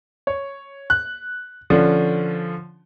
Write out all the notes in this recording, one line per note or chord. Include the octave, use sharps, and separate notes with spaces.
C#5
F#6
D3 F3 C#4